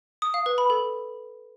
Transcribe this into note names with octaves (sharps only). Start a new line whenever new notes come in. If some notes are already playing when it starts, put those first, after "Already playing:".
D#6
F5
B4
B5
A4